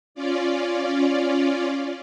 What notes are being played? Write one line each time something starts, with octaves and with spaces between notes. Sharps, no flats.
C#4 F4 D5